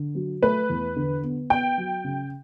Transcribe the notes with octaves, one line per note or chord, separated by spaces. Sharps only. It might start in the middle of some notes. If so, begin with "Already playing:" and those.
Already playing: D3
F#3
A3 B4
E2
D3
B3
B3 G5
F#3
C#3